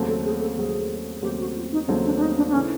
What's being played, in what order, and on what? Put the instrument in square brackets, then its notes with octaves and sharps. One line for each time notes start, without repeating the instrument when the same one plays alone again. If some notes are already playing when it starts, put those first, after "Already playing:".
Already playing: [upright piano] D#2 C#3 F#3 A3 C4
[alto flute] A4
G#4
A4
[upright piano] D#2 C#3 F#3 A3 C4 [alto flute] G#4
[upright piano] D#2 C#3 F#3 A3 C4 [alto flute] G4
[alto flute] F#4
F4
D#4
[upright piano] D#2 C#3 F#3 A3 C4 [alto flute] D#4
[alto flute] D4
D4
D#4
D4
D4
[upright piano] C#3 E3 A3 [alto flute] C#4